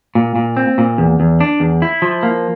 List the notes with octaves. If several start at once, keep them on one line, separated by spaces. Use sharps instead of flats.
A#2
A#2
C4
A#2
E2
E2
D4
E2
E4
F3
A#3